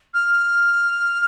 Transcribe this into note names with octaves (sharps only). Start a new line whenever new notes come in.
F6